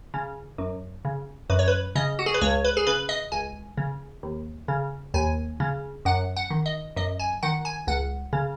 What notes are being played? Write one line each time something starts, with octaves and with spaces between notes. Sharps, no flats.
C#3
F#2
C#3
F#2 B4
C#5
B4
C#3 D#5
F#4
G#4
B4
C#2 C#5
B4
G#4
C#3 B4
D#5
C#2 G#5
C#3
D#2
C#3
D#2 G#5
C#3
F#2 F#5
F#5
D#3
D#5
F#2 D#5
G#5
D#3 F#5
G#5
C#2 F#5
C#3